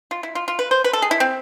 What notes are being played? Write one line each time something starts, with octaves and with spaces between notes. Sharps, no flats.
F4
E4
F4
F4
B4
C5
B4
A4
G#4
E4
C4